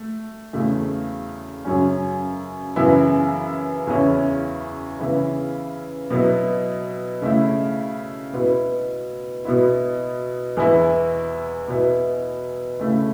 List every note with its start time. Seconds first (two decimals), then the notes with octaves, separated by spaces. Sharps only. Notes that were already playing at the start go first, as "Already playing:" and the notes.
Already playing: A3
0.53 E2 C#3 A3
1.65 F#2 C#3 F#3 C#4
2.76 F#2 C#3 E3 B3 E4
3.87 E2 C#3 E3 C#4 E4
4.99 C#3 E3 B3 E4
6.10 B2 F#3 B3 E4
7.22 C#3 A3 E4
8.33 B2 B3 E4
9.45 B2 B3 E4
10.57 E2 E3 B3 E4
11.68 B2 B3 E4
12.79 C#3 A3 E4